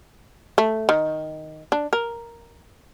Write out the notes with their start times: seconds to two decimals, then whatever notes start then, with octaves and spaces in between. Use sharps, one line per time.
0.58 A3
0.89 D#3
1.72 D4
1.93 A#4